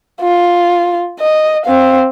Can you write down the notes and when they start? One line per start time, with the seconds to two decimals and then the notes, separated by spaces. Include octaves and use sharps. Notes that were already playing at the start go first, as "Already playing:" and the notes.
0.21 F4
1.20 D#5
1.66 C4 F5